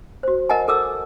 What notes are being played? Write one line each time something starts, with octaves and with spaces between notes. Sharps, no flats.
F#4 C5
A#4 D#5 F#5 G#5 A5
A4 A#4 D6 E6